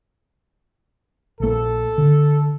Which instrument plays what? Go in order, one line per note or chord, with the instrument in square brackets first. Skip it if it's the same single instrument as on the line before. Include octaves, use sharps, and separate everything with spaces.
[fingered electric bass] A#1 A#3 [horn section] A4
[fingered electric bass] D3